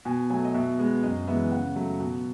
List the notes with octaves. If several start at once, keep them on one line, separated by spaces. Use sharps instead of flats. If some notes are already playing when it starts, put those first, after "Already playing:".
B2 G#5
F#3 A3 G#5
D#5
B2 E5
G#3 B3
F#2 D#5
E3 G#3 B3 E5
C#3 F#5
F#3 A3
B2